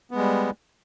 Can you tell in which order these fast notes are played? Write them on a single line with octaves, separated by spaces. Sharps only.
B3 G#3 G3